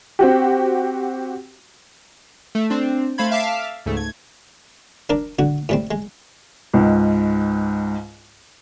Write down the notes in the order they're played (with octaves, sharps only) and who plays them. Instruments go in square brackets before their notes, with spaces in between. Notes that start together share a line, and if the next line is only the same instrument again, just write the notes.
[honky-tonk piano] C4 F#4 G4
[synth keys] A3
C4 D4
A3 C5 F5 B5 G#6
E5 F5 A5 D6 B6
C#2 G#2 A3
G#6
[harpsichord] D4 A#4 D5
D3 F#4
A2 G3 C4
G#3
[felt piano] C#2 G#2